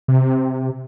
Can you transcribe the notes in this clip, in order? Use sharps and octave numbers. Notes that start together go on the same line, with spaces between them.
C3